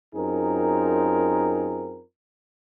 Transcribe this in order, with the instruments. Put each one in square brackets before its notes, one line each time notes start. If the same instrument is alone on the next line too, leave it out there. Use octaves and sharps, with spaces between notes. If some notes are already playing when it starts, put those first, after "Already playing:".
[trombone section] F#2 C4 D#4 F4 G#4 A#4